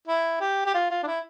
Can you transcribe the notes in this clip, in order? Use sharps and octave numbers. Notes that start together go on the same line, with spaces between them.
E4
G4
G4
F4
F4
D4
E4